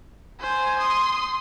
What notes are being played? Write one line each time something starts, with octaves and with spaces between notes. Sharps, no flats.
C5 G#5
C6 D#6